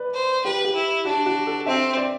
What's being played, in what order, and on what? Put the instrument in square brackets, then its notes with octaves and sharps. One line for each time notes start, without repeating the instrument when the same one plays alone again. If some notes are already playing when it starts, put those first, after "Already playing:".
Already playing: [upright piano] B4 D5
[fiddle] C5
[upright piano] G4 [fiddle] B4
[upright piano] G4
[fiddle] E4
[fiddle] D4 [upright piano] F#4
[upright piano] F#4
A4
[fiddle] C4 [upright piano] E5
[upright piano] D5